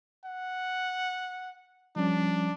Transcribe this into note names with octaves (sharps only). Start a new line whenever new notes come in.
F#5
F3 G3 C#4 D4